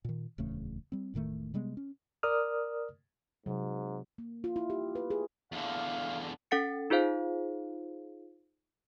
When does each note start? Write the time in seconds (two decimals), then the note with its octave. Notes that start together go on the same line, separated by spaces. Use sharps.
0.05 A#2 D#3
0.38 D1 E2 C#3 A3
0.92 G3 C4
1.14 E1 A2 D#3 A3
1.54 C3 G3 G#3 B3
1.77 C#4
2.23 A#4 D5 D#6 F6
3.46 G#2 C3 F#3
4.18 A#3
4.44 F4
4.56 E4
4.70 G4
4.95 B4
5.10 G#4
5.52 E2 D3 F5
6.51 C#4 A4 F#5 A6 C#7
6.90 D#4 F4 G#4 C5 F5